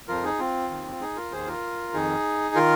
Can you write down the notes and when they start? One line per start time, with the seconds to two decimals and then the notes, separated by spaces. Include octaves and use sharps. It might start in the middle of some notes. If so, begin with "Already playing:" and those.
0.08 F2 F3 F4 A#4
0.24 D#4 G#4
0.39 C4 F4
0.70 D#2 D#3
0.91 F4
1.01 D#4 G#4
1.17 F4 A#4
1.32 D#2 D#3 G#4 C5
1.47 F4 A#4
1.94 F2 D#3 D#4 G#4
2.55 D#3 F4 A#4